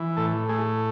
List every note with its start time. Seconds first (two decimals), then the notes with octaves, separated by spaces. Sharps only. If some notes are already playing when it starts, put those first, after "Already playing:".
Already playing: E3
0.17 A2 A4
0.49 A3 G#4